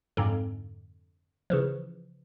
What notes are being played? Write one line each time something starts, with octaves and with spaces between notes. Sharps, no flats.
F2 G#2 D3
C#3 E3 F3